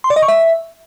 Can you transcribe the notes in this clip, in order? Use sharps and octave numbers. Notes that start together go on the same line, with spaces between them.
C6
D5
D#5
C#6
E5